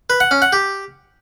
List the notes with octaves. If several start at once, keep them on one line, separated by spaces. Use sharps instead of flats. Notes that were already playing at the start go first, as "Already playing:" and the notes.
B4
F#5
C#4
F#5
G4